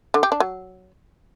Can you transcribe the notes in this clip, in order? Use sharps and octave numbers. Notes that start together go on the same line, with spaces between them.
D3
G4
D4
F#3